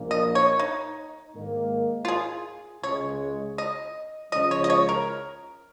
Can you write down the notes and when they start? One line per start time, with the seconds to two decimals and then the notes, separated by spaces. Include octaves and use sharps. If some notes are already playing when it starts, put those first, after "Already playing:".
Already playing: A#1 A#2 A#3
0.11 D#5
0.35 C#5
0.59 D#4
1.35 G#2 D#3 A#3
2.05 F4
2.08 G#4
2.83 C#2 C#3 G#3 C#5
3.58 D#5
4.32 C#2 C#3 F3 D#5
4.51 C#5
4.64 D#5
4.70 C#5
4.89 A#4